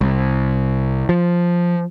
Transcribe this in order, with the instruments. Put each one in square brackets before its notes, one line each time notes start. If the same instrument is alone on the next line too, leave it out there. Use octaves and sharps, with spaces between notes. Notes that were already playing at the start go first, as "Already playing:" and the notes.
[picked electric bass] C2
F3